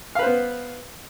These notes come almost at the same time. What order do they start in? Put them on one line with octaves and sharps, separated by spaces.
F5 B4 C5 B3